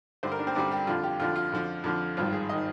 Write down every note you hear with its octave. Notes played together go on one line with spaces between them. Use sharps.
G2 D3 G3 C5
A#4
D4
C4
G2 D3 G3 D4
G4
F2 D3 F3 F4
G4
F2 D3 F3 F4
F4
F2 D3 F3
F2 D3 F3
G#1 G2 D#3 F4
G#4
D#3 D#5